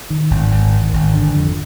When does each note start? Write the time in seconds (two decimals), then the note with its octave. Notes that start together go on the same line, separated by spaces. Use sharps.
0.10 D#3
0.31 G#1
0.52 G#1
0.72 D#3
0.93 G#1
1.14 D3
1.34 F2